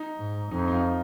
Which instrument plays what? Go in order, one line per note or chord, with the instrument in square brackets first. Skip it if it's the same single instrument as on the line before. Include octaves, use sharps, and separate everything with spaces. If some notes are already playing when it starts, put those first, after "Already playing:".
Already playing: [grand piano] D#4
[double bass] G#2
[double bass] F2 [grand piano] D#4
[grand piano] D#4
F4